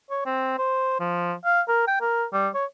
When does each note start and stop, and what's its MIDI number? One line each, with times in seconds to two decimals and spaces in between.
0.10 0.21 73
0.26 0.58 60
0.58 0.95 72
1.00 1.34 53
1.45 1.61 77
1.68 1.84 70
1.87 1.97 79
2.01 2.25 70
2.33 2.49 55
2.54 2.65 73